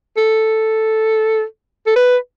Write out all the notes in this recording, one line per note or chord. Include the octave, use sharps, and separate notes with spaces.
A4
A4
B4